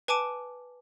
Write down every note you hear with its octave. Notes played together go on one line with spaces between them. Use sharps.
B4 G#5 A5 D6 D7 D#7